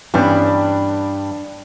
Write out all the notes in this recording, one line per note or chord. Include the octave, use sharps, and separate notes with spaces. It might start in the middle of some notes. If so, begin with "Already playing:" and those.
G2 E3 G3 B3 C#4 D4